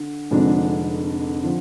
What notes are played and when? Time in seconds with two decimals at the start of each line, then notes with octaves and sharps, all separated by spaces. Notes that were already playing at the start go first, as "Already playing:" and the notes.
Already playing: D3
0.31 F1 F2 D3 G#3 D4
1.43 D3 F3